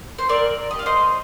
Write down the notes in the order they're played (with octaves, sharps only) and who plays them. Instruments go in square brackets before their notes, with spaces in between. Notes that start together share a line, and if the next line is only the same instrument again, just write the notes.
[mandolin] C5
C4 A#4 D5
G4 D#5
F5
C5 D#5